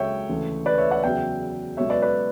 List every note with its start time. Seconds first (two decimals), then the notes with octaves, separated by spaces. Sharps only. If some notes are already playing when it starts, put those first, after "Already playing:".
Already playing: C#2 C#3 F#3 C#5 E5 G5
0.29 D2 C#3 E3
0.66 B4 D5
0.78 C#5 E5
0.91 D5 F#5
1.03 E2 C#3 F#3 E5 G5
1.77 C#2 B2 F#3 C#5 E5
1.90 B4 D5
2.02 B4 D5